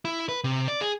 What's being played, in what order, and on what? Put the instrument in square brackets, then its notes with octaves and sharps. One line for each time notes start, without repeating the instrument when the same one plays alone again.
[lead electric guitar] E4
B4
C3
D5
G#4